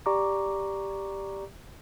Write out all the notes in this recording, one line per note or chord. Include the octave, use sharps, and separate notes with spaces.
G4 D5 A#5 C#6 D6